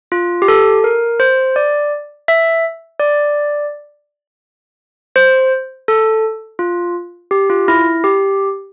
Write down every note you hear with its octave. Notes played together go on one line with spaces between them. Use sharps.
F4
G4
A4
A#4
C5
D5
E5
D5
C5
A4
F4
G4
F4
E4
G4